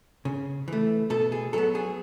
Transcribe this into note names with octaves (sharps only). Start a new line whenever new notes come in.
C#3
E3 A3
B2 A4
G#4
F#3 B3 A4
G#4